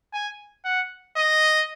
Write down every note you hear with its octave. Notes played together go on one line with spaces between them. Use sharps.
G#5
F#5
D#5